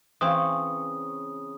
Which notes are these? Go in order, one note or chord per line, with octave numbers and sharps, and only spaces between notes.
C#3 E3 C4 C#6 D#6